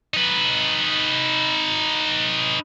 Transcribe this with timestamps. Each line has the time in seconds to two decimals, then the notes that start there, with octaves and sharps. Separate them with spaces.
0.14 D#4 B4